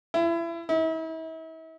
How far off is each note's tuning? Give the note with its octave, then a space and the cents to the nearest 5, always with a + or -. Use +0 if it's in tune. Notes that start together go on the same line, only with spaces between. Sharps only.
E4 +30
E4 -40